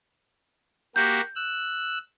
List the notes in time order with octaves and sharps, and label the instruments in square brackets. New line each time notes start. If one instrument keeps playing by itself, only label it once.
[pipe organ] A#3 F#4 G4 [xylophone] G6
[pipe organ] E6 F#6